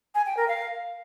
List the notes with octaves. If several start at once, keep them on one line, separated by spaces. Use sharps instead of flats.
G#5
G5
A#4
F5